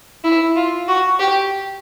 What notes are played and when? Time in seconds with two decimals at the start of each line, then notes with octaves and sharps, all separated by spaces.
0.24 E4
0.56 F4
0.88 F#4
1.20 G4